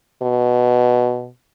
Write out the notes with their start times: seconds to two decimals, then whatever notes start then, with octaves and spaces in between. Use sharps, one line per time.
0.22 B2